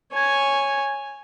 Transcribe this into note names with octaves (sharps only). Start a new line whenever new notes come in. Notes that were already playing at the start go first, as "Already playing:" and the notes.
C#5 G#5